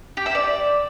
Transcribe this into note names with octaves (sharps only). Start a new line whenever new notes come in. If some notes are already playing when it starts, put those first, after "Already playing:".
G4
E5
D5